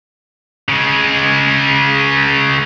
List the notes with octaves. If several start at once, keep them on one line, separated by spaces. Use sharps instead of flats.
C#3 G#3